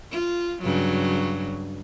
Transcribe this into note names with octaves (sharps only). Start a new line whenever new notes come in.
F4
G2 C#3 F#3